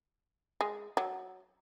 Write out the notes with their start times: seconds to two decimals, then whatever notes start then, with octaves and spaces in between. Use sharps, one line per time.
0.61 G#3
0.97 F#3